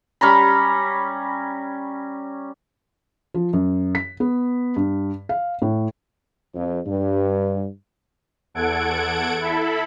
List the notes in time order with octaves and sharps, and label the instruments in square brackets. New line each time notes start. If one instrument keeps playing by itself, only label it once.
[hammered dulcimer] G3 C#4 A#5 B5
[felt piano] F3
F#2
B6
B3
G2
F5
A2
[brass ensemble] F2
G2
[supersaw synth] E2 A4 F#5 G#6 D7
E4 A4 B5